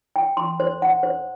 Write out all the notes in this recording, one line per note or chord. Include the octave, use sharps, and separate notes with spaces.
G5
C6
C5
F#5
C5